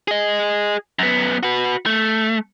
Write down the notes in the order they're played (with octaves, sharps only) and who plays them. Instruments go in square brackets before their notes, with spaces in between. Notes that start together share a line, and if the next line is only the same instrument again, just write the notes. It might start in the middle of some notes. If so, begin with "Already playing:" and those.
[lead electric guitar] G#4 D#5
F#2 B3
F#4 B4
A3